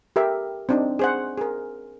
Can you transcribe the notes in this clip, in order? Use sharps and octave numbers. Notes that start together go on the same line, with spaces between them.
G4 A4 A#4 E5
C4 D4 D#4
G#4 C5 F#5
G#4 A#4